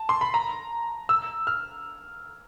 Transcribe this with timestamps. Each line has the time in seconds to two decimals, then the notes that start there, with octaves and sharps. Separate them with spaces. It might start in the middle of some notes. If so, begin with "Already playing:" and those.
Already playing: A5
0.09 C6
0.21 B5
0.34 A#5
1.09 E6
1.47 F6